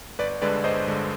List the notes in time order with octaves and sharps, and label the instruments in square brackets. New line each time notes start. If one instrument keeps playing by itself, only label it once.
[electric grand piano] G1 B4 D5
G2 D3 G#3 B4 D5
G1 C5 D#5
G2 D3 G#3